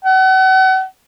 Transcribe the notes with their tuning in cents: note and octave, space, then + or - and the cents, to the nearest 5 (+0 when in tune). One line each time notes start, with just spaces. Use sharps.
F#5 +35